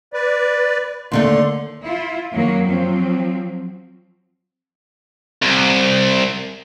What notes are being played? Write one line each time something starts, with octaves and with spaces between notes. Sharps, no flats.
B4 D5
D#2 D3 A3 C6
E4 F4
F#2 D#3 F#3 A#3
F3 F#3 C4
C2